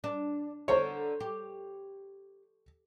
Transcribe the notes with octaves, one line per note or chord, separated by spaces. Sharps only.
D4
D3 A#4 C5 C#5
G4